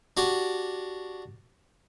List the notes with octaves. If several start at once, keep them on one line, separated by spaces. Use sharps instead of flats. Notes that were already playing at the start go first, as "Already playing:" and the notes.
D4 F#4 G4